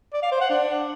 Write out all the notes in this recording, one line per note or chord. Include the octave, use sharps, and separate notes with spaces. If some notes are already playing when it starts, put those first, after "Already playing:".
D5
F5
C5
F#5
D4